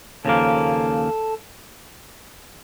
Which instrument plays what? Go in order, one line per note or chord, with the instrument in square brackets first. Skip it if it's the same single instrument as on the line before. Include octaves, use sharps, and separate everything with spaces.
[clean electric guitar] D#2 C#3 F3 A#3 [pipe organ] A4 A5